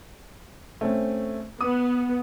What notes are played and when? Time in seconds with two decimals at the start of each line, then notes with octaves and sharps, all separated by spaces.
0.81 A3 C4 C#4
1.61 B3 D#6